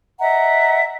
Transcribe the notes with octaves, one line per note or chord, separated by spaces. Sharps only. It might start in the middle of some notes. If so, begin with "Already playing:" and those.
D#5 E5 F#5 A#5